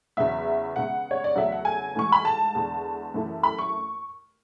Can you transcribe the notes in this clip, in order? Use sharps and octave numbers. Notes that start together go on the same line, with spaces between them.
E2 C#3 F#3 B3 E5
C#3 G#3 B3 F#5
C#5
D5
E2 C#3 F#3 A3 E5
F#5
G#5
G#2 E3 A3 C#6
B5
A5
E2 D3 G#3
F#2 E3 A3 E4
B5
C#6